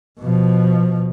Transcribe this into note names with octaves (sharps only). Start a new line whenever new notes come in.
B2 F3